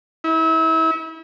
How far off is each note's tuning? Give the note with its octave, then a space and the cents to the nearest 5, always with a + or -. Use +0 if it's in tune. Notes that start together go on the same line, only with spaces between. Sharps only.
E4 -35